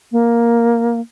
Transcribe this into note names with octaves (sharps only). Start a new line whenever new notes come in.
A#3